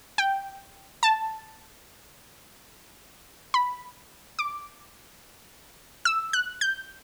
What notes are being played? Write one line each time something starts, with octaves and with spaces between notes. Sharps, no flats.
G5
A5
B5
D6
E6
F#6
G6